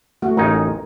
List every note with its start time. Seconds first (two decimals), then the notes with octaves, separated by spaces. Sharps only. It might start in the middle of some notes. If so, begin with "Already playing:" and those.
0.22 A3 F#4
0.37 A1 D#4 A#4 G#5